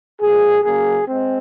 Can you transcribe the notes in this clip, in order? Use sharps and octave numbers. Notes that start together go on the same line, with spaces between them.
A#2 F3 G#3 G#4
C#3 F#3 A#3 G#4
G#3 C4